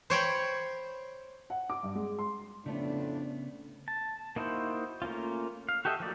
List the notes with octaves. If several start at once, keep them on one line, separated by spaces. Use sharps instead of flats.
C5 C#5 G5 B5
F#5
D6
G2
G#3
C6
F2 A2 C#3 A3 B3 D4
A5
A#3 D#4 E4 F#4 C5
A3 A#3 C#4 F4
F5
F#4 G4 A4 D#5 E5
F3 F#3 A3 A#3 D5